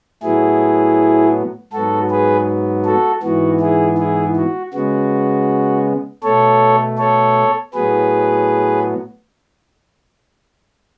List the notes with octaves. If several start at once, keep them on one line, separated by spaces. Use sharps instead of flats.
A2 F#3 B3 E4 G#4
G#2 F#3 B3 F#4 A4
G#4 B4
F#4 A4
G#2 E3 B3 F#4
E4 G#4
E4 G#4
F#4
C#3 G#3 B3 F#4
B2 A3 A4 C#5
A4 C#5
A2 F#3 B3 G#4 B4